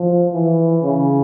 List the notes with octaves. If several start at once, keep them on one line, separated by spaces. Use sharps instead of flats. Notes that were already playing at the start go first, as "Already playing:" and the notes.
Already playing: F3
E3
C#3